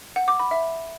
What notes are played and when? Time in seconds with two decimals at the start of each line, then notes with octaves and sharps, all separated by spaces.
0.16 F#5
0.28 D6
0.39 B5
0.51 E5